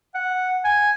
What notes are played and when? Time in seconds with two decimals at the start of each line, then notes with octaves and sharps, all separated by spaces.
0.15 F#5
0.65 G#5